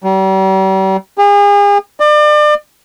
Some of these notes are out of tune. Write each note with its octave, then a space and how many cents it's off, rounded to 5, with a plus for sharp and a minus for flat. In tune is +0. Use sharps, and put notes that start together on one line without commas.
G3 -40
G#4 -40
D5 +35